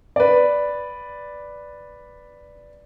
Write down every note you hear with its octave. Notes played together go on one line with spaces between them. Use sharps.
B4 D5